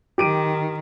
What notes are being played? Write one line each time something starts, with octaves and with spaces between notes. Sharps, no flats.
D#3 G4 D7 D#7